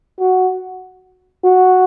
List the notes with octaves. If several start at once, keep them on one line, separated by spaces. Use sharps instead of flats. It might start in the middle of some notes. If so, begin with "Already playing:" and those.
F#4
F#4